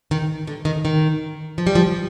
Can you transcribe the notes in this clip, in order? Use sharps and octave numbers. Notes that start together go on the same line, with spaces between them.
D#3
D3
D#3
D#3
F3
G3
F3